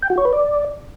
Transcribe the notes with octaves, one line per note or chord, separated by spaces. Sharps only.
G5
F#4
C#5
B4
D5